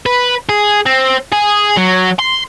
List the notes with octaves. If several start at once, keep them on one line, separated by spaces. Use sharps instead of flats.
B4
G#4
C4
G#4
F#3
C6